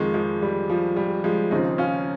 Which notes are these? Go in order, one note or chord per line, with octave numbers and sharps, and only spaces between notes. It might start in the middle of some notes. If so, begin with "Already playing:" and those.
Already playing: F2 D#3 F3 G#3
F3 G#3
G3
F3
G3
F3 G#3
D#2 C#3 F3 C4 D#4
C#4 F4